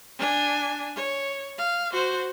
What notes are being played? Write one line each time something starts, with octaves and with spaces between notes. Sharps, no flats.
D4 G#5
C#5
F5
F#4 C5